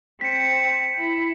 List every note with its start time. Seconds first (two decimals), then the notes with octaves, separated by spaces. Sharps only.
0.21 C4 B6 C#7
0.97 E4